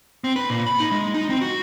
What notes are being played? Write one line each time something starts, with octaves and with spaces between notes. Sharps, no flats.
C4
B4
A#2
B5
D#4
G#3
D#4
C4
F#4